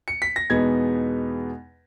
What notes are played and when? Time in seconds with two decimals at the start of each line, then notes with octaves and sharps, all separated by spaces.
0.08 C#7
0.22 B6
0.36 A#6
0.50 E2 B2 G#3 B3 D#4 G#6